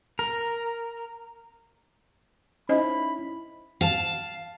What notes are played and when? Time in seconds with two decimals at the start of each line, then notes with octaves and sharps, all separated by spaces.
0.19 A#4
2.69 C#4 D#4 E4 C5 D#5 B5
3.81 F5 A5